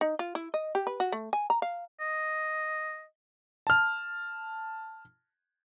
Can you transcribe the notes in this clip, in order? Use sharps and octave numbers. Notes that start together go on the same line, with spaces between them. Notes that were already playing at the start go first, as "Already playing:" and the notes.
D#4
F4
E4
D#5
G4
B4
F#4
A3
G#5
A#5
F5
D#5
A5 F6